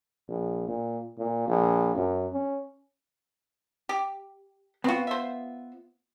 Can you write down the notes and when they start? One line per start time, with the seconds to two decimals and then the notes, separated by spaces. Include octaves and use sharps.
0.29 A#1
0.68 A#2
1.18 A#2
1.48 A#1
1.96 F#2
2.33 C#4
3.89 G4
4.84 B3 C4 F4 F#4
5.07 C5 E5